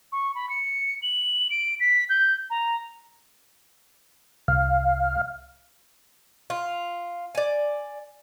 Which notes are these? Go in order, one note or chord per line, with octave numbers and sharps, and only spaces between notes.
C#6
B5
C#7
F#7
D7
B6
G6
A#5
C2 F5
F4
D5 G#5